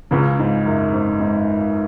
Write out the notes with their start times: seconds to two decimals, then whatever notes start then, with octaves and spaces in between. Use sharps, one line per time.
0.11 C#2 C#3
0.39 G#2
0.66 F#2
0.93 G#2
1.20 G#2